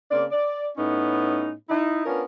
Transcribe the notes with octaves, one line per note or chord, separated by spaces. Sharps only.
C#3 A#3 C4 D5
D5
A2 B3 C#4 D#4
D#4 E4
B3 C#4 D4 F4 A#4